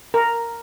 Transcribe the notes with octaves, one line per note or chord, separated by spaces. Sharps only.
A#4